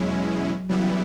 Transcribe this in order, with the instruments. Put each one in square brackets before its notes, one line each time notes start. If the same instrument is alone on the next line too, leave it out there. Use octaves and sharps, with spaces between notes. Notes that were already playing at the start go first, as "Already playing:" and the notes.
Already playing: [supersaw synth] E2 B2 G#3 C#4 E4 [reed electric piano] F#3
[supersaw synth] C#3 E3 G3 B3 E4 [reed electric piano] F#3